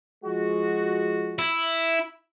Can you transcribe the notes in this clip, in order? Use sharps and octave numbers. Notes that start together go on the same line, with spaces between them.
F3 G#3 F#4
E4